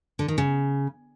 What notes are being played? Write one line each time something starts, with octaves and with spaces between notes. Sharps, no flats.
D3
D#3
C#3